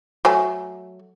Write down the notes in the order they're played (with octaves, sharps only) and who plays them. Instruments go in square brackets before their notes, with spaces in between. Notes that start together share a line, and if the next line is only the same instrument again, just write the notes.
[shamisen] F#3 A3 G#5